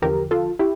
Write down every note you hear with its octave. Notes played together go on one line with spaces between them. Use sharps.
E2 D3 F3 G4 A#4
F4 A4
E4 G4